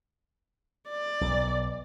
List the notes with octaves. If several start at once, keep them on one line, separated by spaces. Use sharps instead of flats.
D5
B1